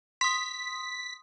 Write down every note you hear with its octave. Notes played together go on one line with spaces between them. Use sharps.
C6 D#6 B6